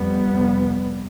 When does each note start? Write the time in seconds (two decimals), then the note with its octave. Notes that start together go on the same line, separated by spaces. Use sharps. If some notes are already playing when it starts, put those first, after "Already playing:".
Already playing: F2 G3 B3
0.27 F2 C3